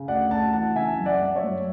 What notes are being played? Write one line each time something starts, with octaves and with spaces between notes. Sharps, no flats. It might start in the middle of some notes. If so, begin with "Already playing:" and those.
Already playing: C#3
D2 D5 F#5
D2 F#5 A5
E3 F#5 A5
C#3 E5 G#5
F#2
D5 F#5
F#2
C#5 E5
F#3